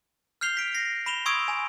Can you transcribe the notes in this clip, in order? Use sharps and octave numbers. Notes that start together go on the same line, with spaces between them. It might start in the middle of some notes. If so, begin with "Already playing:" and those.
F6 G6 C7 F7 G7
B6 D7
A#6 C7
B5 E7 F7 G7
C6 C#6 D#6 E6 G#6 D7
G#5